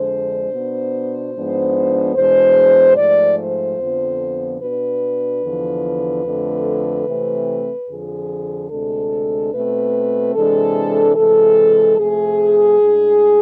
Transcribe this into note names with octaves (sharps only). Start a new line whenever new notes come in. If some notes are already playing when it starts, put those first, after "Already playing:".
Already playing: F2 D3 G#3 D4 C5
B2 B3 D4
G#2 F3 G#3 B3 D4
E2 B2 G#3 D4 C5
G#2 F3 A3 D5
C5
F2 D3 F3 B3
B2 B3 D4 B4
E2 D3 F3
F2 D3 A3
C3 E3 A3 C4
F2 D3 F3 G#4
D2 C3 G#3 D4 A4
B2 A3 C4 B4
C3 E3 G#3 D4 A4
C3 E3 G#3 A4
C3 F3 A3 G#4
A2 G#3 D4